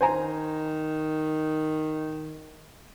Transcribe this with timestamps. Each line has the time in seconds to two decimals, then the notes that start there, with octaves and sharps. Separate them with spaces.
0.01 D#3 C5 G#5 A#5